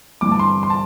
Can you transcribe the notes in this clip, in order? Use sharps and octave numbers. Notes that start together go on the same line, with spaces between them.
G1 G2 E3 D6
A5
C6
C6
A5